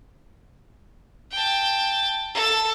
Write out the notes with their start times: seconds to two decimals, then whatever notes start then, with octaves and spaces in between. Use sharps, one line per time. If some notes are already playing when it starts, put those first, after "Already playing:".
1.32 G5 A5
2.34 A4